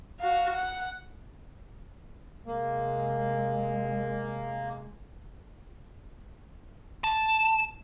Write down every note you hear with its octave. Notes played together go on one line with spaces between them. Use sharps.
F#4 F5
F#5
C3 G#3 A#3
A5